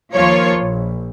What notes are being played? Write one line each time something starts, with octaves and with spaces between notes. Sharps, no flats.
D#2 F3 A#3 F4 C#5
A#1